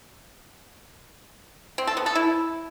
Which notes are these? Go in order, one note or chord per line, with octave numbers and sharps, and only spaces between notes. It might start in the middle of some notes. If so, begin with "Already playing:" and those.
C4
A4
B3
A4
E4